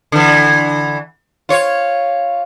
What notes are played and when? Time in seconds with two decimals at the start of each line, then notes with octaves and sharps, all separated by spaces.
0.12 D3 E3
1.49 F4 C#5